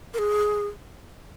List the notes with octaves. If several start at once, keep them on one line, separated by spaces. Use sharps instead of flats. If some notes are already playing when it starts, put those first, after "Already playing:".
A#4
G#4